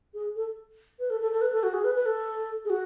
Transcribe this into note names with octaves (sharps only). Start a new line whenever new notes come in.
G#4
A4
B4
A4
A4
A4
B4
A4
F#4
G#4
B4
B4
A4
G#4
F#4